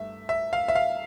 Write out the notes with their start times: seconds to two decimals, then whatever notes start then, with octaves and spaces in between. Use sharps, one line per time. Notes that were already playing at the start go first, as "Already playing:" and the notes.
Already playing: G2 A3 E5
0.29 E5
0.53 F5
0.68 E5
0.75 F5